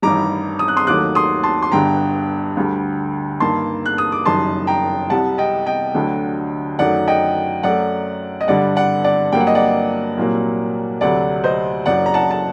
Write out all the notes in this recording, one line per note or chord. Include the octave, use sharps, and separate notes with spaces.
A1 G2 D#3 G3 A#5 D6
D#6
F#6
C6 D#6
D#2 D#3 F#3 A3 D6 F#6
C6 D#6
A5 C6
C6
G1 G2 D3 G5 A#5
D2 D3 G3
G2 D#3 G3 A#3 A5 C6
F#6
D#6
D6
F#1 F#2 D#3 G3 A5 C6
G5 A#5
C2 C3 G3 F#5 A5
D#5 G5
D#5 G5
D2 D3 F#3 A3
F#2 D#3 F#3 A3 D5 F#5
D#5 G5
F#2 F#3 A3 D5 F#5
D#5
G2 D3 G3 D5 F#5
D5 F#5
D5 F#5
G2 F#3 A#3 G5
F#5
D#5
D5 F#5
C2 A#2 F#3 A#3
D2 C3 F#3 A3 D5 F#5
C5 D#5
F#1 F#2 F#3 D5 F#5
A#5
F#5 A5
A5